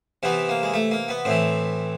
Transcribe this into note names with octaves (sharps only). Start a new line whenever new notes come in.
C3 E3 B3
A#3
G#3
A3
A#3
B3
A2 E3 C4